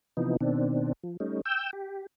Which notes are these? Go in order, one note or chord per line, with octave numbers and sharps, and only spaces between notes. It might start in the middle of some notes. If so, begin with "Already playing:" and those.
C3 E3 F3 B3 D#4
B2 D#3 C4 D4
F3
G3 A3 C#4 D#4
G5 E6 G6
G4